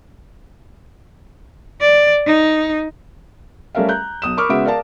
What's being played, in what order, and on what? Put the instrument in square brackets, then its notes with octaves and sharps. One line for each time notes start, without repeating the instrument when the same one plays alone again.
[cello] D5
D#4
[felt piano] G3 A3 C#4 A#4 E5 F5
A#5 F#6 G6
B1 D#6 E7
A#4 B5 C#6 D6 F6
C#3 G#3 B3 F#4 E5 D7
A#4 D5 F5 A5